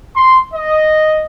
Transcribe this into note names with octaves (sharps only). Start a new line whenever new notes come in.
C6
D#5